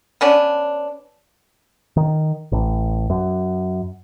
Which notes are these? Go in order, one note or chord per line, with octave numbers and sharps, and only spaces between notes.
B3 C#4 D4
D#3
A1
F#2